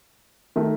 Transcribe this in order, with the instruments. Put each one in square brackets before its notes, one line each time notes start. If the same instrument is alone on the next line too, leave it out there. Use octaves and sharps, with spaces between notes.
[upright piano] D#3 A3